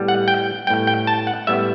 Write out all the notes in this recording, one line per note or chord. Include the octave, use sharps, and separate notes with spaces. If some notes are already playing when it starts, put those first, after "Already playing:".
Already playing: A2 G3 B3
F#5
G5
A2 G3 B3 G5
G5
A5
F#5
A2 G3 B3 E5